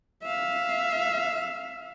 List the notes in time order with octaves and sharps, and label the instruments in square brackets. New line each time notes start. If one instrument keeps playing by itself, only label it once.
[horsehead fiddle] E5 F5